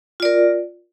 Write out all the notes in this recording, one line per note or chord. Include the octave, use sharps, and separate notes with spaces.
F4 A#4 D5